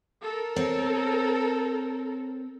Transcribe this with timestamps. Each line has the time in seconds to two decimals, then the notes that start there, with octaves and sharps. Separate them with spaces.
0.22 A4 A#4
0.56 C4 C#5